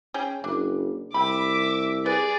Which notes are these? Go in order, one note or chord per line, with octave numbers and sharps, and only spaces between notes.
C#4 G#4 G5
F#1 D4
C2 E5 G5 B5 D6
G#4 B4 D5